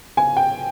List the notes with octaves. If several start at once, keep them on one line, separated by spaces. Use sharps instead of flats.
G#5
G5